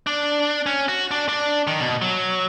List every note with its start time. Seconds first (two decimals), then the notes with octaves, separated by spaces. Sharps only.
0.07 D4
0.66 C#4
0.88 F#4
1.11 D4
1.28 D4
1.67 D#3
1.80 B2
2.01 F#3